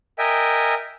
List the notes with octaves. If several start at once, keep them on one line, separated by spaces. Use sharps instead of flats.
A#4 D#5 E5 G5 G#5